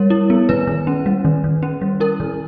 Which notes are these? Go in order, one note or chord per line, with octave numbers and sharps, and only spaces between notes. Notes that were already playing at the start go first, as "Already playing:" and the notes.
Already playing: G3 A#4 C#5
E4
B3
D#3 B4
D#3
C#4
G3
D#3
D#3
C#4
G3
E4 A#4
D#3